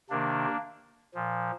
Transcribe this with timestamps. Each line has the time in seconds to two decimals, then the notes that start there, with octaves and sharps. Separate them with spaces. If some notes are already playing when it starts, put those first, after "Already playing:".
0.10 C3 D#3 A#3 D4
1.14 A#2 F3